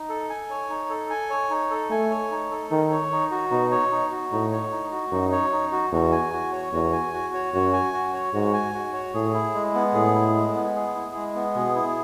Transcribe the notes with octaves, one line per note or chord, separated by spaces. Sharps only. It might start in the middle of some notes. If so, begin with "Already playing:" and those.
Already playing: D#4
A4
G#5
C#5
D#4
A4
G#5
C#5
D#4
A4
A3 G#5
C#5
D#4
A4
D#3 D#4
C#5
D#4
F#4
B2 D#4
C#5
D#4
F#4
A2 D#4
C#5
D#4
F#4
F#2 D#4
C#5
D#4
F#4
E2 F#4
G#5
F#4
C#5
E2 F#4
G#5
F#4
C#5
F#2 F#4
G#5
F#4
C#5
G#2 F#4
G#5
F#4
C#5
A2 G#4
E4
G#3
B3
A2 G#4
E4
G#3
B3
G#4
E4
G#3
B3
B2 G#4
E4